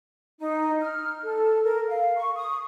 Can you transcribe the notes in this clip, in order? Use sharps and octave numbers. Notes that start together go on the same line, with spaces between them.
D#4
F6
A4
A#4
F5
C#6
D#6